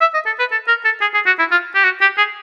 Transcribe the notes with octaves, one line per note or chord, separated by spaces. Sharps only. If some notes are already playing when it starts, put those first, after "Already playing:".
E5
D#5
A4
B4
A4
A#4
A4
G#4
G#4
F#4
E4
F4
G4
F#4
G4
G#4